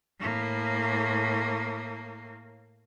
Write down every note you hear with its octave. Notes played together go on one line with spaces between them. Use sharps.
A2 A#3